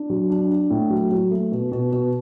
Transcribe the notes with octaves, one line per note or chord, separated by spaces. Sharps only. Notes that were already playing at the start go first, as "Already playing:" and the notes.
Already playing: D4
F#3
D4
D4
A2
F#3
F#3
A3
B2
B2
B2